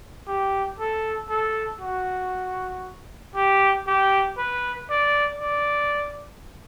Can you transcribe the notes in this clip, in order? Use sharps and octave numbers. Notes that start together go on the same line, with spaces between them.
G4
A4
A4
F#4
G4
G4
B4
D5
D5